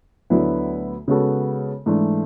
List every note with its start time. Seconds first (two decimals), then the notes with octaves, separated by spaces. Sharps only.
0.30 D2 D3 F#3 B3 E4
1.08 C#3 G#3 B3 F#4 A4
1.86 G#2 E3 A3 D4